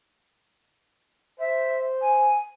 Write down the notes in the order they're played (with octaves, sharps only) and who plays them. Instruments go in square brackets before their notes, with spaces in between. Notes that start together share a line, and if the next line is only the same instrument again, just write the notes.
[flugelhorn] C5 [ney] E5
[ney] G#5